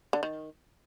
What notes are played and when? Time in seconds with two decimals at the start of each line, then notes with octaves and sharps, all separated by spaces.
0.13 D3
0.23 D#3